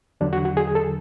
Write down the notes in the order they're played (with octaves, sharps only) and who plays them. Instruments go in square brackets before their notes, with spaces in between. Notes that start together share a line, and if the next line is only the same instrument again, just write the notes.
[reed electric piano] E2 D3 F#3 D4
F#4
F#4
G#4
G#4
A4